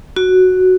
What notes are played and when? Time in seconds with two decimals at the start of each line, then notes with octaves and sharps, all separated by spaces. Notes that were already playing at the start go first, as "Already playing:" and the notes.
0.16 F#4